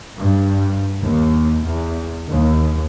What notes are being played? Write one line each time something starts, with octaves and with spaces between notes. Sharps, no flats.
G2
D#2
E2
D#2